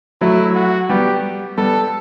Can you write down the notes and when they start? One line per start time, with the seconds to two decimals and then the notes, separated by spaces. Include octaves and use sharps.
0.21 F#3 A3 E4
0.55 F#4
0.89 G3 B3 G4
1.57 G3 B3 A4